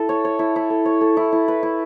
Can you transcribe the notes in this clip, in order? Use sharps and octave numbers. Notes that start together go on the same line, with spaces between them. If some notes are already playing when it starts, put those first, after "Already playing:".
Already playing: E4 A4
C#5
C#5
E4
E4
A4
C#5
A4
E4
E4
B4
E4